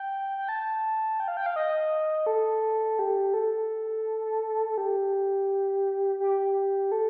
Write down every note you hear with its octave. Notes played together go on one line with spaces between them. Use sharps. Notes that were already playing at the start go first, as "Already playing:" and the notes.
Already playing: G5
G5
A5
G5
F5
G5
F5
D#5
A4
G4
A4
G4
G4
A4